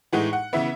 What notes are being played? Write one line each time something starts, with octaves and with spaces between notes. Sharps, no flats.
A2 E3 G#3 D#4 F#5
F#5
C#3 E3 B3 E5